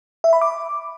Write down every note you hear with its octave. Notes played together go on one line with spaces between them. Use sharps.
E5
B5
D6